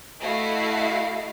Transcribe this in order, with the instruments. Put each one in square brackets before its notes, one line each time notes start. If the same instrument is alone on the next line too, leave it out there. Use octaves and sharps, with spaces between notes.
[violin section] A3 E4 F#4 D#5 F5 C7